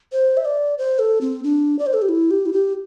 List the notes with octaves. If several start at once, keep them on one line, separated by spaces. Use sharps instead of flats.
C5
E5
D5
C5
A4
C4
D4
D5
C5
A4
G4
E4
G4
E4
G4